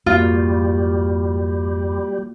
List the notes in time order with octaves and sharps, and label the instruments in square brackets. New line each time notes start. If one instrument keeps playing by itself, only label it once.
[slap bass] F2 G#2 [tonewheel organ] G3 [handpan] A#3 F#4 [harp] F4